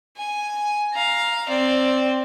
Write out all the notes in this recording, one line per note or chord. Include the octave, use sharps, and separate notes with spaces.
G#5
F5 A#5
C4 D5